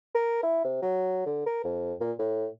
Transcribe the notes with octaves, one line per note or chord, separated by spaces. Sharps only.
A#4
E4
C3
F#3
D3
A#4
F2
A#2
A2